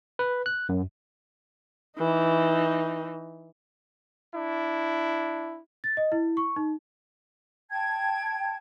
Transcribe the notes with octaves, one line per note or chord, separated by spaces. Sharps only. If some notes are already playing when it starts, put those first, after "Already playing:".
B4
F#6
F#2
E3 D#4
D4 E4
A6
D#5
E4
C#6
D#4
G5 A5 G#6